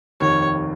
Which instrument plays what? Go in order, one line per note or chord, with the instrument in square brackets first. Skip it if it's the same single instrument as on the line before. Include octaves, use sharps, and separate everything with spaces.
[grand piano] F1 D#2 D#3 [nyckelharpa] C#5